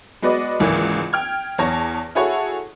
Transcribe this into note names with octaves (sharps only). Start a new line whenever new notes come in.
G#3 B3 F#4 B4 D5 D#5
G#1 C#2 E3 A#3
G5 F6 G#6
E2 C#5 A5 A#6
E4 F#4 G#4 A4 C#5 F#5